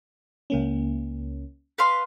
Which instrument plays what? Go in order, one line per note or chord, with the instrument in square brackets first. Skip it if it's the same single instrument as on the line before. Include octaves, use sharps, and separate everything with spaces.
[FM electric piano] C#2 A#3 C#4
[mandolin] B4 F5 C6